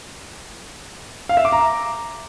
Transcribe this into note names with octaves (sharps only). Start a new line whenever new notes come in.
F5
E5
D6
A#5